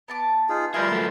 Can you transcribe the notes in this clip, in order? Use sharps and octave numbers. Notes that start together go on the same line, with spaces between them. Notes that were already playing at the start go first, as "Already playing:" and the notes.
B3 A5 D6
D#4 F4 G#4
G3 E4 F4 G#4 A#4 B4 C6 G6
F#3 A3